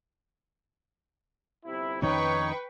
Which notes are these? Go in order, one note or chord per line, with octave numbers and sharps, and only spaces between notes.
G1 C3 E4
F2 D#3 C#4 D#4 B4 C#5 G5 C#6